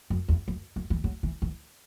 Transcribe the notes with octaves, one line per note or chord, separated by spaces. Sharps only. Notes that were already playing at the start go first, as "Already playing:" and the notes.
F#2
E2
F#2
F#2
E3
F#3
E3
E3